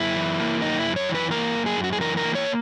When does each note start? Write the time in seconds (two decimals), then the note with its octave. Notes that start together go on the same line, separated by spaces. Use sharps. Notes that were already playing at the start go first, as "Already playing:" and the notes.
Already playing: F#2 E4
0.16 E3
0.40 A#3
0.62 F#2 D#4
0.79 E4
0.86 F#2
0.96 C#5
1.09 E3
1.15 B4
1.31 A#3 A#4
1.55 F#2
1.66 G#4
1.77 F#2
1.84 F#4
1.93 G#4
2.00 E3 A#4
2.17 A#4
2.24 A#3
2.35 C#5